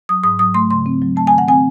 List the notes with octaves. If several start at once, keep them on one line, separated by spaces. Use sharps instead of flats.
F#3 D#6
G#2 D#6
F#3 D#6
A3 C6
C#3 C6
C4
F#3
A3 A5
G#5
D#3
F#5
C4 G#5